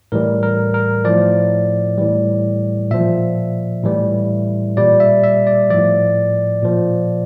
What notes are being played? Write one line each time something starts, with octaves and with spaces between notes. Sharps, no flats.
A2 E3 G3 A#4
A#4
A#4
A2 F3 D5
A2 E3 G3
A#2 F3 E5
A2 E3 G3
A#2 G3 D5
E5
E5
D5
A2 F3 D5
A#2 F3